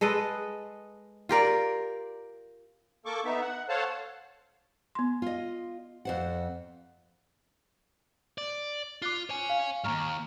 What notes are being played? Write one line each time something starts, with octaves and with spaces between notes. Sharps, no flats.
G#3 A4 B4 D#5
F4 G4 A#4 D5
A#3 A4 C#6 D6
B3 D#4 E5
F#5
A4 C5 C#5 F5 F#5 A5
B3 C6
F4 D#5
F2 C5 F#5
D5
F4 D6 F#6 C7
C#5 G#5
F5
D#2 G#2 A#5 C#6 F6